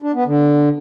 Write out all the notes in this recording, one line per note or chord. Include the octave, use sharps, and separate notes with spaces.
D4
B3
D3